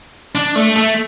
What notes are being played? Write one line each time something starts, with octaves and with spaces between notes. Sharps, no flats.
D4
A3
A3